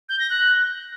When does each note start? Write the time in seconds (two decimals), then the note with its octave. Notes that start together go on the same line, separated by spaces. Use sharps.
0.09 G6
0.19 A#6
0.30 F#6